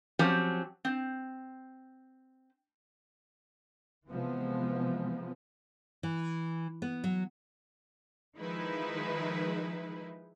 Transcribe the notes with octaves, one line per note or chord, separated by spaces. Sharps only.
F3 F#3 C4 C#4 G4
C4
C3 E3 F3 G#3 B3
E3
B3
F#3
D#3 F3 G#3 D#4 E4 B4